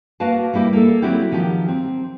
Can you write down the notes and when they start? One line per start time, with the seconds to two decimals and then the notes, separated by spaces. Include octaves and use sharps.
0.20 A#3 F#4 B4 F5 A5
0.53 G3 A#3 E4 G4
0.73 A#3 A4
1.02 F#3 C4 E4 F#4 G4
1.31 D#3 F3 F#3 G4
1.68 C4